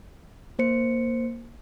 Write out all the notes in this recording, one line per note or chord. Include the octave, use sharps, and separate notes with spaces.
A#3 C5 C#7